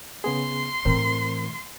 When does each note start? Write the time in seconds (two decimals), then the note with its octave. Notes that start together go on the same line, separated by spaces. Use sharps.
0.24 C#3 B3 G#4 C6
0.85 A2 E3 C4 A#4 C5